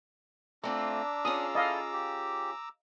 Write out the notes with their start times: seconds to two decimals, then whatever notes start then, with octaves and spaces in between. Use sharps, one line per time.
0.63 A3 C4 D4 F4 A#5 D6 E6
1.25 C#4 F4 G#4 D#6
1.55 E4 A4 D5 D#5 F5
1.93 G4